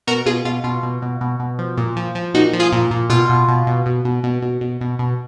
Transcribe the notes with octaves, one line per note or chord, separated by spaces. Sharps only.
B2 F#4 A#4
B2 F4 G#4
B2 F4
B2 F4
B2
B2
B2
B2
F3
A#2
F3
F3
A#2 D#4 F#4
F3
F4 G#4
A#2
A#2
B2 F4
B2
B2
B2
B2
B2
B2
B2
B2
B2
B2